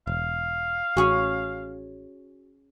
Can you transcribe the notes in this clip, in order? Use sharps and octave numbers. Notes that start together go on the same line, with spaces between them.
E1 F5
A1 C#4 F#4 G#4 C#5